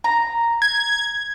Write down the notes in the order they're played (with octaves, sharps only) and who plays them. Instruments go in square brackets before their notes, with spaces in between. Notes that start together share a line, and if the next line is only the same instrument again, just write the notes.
[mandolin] A#5
[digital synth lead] G#6